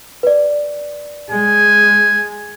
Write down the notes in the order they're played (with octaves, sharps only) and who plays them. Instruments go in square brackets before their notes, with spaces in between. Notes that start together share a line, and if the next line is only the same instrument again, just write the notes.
[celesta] B4 D5
[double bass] G#3 [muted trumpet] G#5